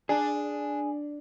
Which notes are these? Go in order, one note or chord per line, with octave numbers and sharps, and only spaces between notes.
D4 G#4